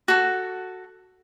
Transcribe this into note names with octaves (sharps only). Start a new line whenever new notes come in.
F#4 A4